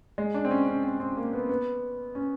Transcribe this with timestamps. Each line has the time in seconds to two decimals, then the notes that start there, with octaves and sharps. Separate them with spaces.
0.18 G#3
0.34 D4
0.45 C4
0.51 C#4
0.67 C#4
0.83 C4
1.00 C4
1.17 A#3
1.33 B3
1.49 B3
2.15 C#4